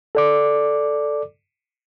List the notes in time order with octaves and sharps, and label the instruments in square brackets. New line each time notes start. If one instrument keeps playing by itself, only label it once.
[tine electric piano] A4 D5 D6